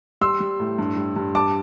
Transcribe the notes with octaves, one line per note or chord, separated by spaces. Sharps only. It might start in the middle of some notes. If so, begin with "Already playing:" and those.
G3 C6 E6
G3
A2
G2
G3
G2
G3 A5 D6